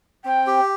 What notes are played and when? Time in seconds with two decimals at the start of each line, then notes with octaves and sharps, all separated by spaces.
0.25 C4 G5
0.47 G4